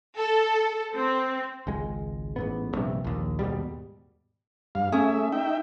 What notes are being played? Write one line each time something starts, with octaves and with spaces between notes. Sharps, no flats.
A4
C4
G#1 C#2 G#3
A1 G#2 B3
A#1 G2 C3
A#1 D#2
D#2 G#2 B2 G3
G2 F5
A3 C#4 G#4 E5
D#4 E5 G5